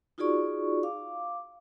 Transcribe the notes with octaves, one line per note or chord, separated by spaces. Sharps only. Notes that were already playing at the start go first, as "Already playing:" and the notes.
D#4 F4 F#4 G#4 D5 C#6
F5 D6